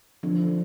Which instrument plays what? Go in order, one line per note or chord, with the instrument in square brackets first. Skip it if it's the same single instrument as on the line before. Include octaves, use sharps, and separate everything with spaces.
[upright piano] D3 [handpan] F3